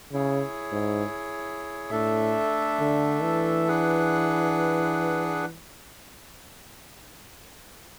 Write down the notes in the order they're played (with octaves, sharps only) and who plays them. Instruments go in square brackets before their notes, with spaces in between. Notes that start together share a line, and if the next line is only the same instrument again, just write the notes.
[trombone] C#3 [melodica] E4 G#4 C#5
[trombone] G#2
[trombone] A2 [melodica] A3 D4 A4 E5
[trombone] D3
E3
[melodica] D4 G#4 B4 F#5